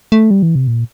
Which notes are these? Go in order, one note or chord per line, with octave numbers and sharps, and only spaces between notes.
A3
G3
E3
C3
A#2